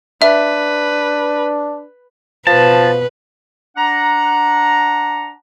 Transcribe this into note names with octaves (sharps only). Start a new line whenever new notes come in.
D4 B4 E5
B2 F3 B4 A5
D4 F#5 A#5